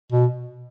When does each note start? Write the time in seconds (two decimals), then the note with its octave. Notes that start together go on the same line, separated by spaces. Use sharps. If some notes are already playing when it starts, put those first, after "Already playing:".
0.13 B2